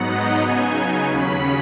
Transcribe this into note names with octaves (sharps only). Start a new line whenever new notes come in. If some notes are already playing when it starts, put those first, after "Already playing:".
Already playing: G#2 F#3 B3 D#4 F#5
D#5
C#3 F#3 B3 D#4 G#5
D#2 C#3 F#3 C#4 B5